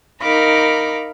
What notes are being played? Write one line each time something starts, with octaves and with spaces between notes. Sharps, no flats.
D#4 A#4 F5 B5 D6